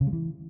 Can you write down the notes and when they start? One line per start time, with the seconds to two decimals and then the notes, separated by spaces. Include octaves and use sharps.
0.01 C#3
0.07 G#3
0.13 E3